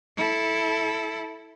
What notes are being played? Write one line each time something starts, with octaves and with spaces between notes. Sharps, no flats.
E4 A4